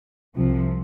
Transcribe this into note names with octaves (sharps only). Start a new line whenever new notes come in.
C2 C3 F3